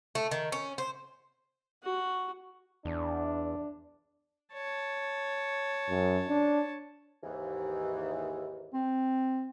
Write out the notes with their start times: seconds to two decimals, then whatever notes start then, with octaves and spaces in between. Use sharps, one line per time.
0.15 A3
0.31 D#3
0.52 C#4
0.78 C5
1.83 F#4
2.85 E2 D4
4.53 C#5 A5
5.89 F#2
6.29 D4
7.23 D#2 G#2 E3
8.74 C4